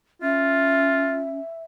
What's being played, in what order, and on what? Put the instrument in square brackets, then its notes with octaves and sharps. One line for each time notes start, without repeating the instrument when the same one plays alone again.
[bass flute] C#4 [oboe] F4 [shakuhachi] E5